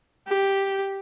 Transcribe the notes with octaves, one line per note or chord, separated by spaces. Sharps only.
G4